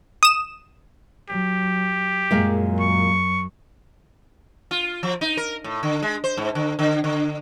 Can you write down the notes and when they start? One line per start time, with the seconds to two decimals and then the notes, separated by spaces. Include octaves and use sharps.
0.23 D#6 E7
1.30 F#3 G4
2.31 F#2 A#2 F#3 G#3 F5
2.80 C#6
4.71 F4
5.03 F3
5.21 D#4
5.37 A#4
5.64 A2
5.83 D3
6.02 G#3
6.24 C5
6.37 G#2
6.55 D3
6.79 D3
7.04 D3